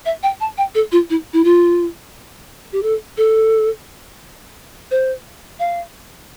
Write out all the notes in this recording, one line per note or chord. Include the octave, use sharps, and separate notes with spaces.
E5
G5
A5
G5
A4
F4
E4
E4
F4
G4
A4
A4
C5
F5